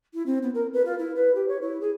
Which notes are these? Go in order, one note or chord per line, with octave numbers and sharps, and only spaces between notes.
E4
C4
B3
A#4
B4
F4
E4
B4
G4
C#5
E4
G#4